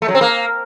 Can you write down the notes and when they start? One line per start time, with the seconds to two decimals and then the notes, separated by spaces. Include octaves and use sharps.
0.02 A3
0.08 F#3
0.15 C4
0.21 A#3